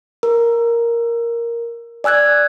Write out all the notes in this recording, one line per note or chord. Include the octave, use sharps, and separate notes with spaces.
A#4
D5 G#5 E6 F#6 G#6